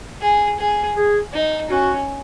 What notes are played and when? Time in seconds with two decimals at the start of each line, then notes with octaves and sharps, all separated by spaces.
0.22 G#4
0.60 G#4
0.96 G#4
1.34 D#4
1.70 C#4 F#4